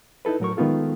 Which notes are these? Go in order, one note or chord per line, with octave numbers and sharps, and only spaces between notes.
D#4 E4 A4 B4
A2 F#3 A#4 C#6
D#3 G#3 B3 D#4 F4 A4